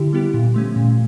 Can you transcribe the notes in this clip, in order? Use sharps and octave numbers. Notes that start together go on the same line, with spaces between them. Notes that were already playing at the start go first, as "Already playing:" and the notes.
Already playing: D3 E4 G4
G3 B3 E4 G4
A#2
F3 A3 C#4
A#2